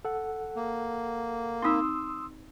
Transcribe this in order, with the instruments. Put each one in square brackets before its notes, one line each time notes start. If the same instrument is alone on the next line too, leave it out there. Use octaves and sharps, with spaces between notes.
[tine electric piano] A4 F#5
[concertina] A#3
[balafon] C4 D#4 [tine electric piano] C6 D#6 E6